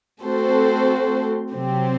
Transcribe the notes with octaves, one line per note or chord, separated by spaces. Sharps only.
A3 C4 F#4 A4 C5
C3 F#3 C4 G4